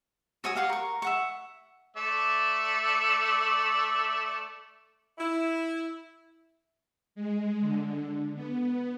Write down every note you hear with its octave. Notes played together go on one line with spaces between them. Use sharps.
F#4 C#5 G#5 D#6
G4 F5 F#5 C#6
A#4 C#6
E5 F#5 C#6
A3 D5 E5
E4
G#3
D3
B3